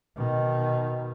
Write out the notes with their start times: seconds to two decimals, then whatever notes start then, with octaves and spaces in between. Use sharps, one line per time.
0.16 B2 D#3